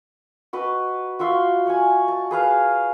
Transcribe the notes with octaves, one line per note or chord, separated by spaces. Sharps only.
F#4 B4 D#5
F4 F#4 E5 C6
C#5 F#5 G#5
A5
G#4 B4 F5